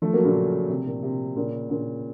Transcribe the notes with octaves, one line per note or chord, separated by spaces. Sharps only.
F3 A3
F#3 A#3
A#2 C#3
C3
A#2
C3
A#2 C#3
A#2 C#3